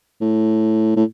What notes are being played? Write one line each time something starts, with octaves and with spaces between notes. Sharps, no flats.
A2
A2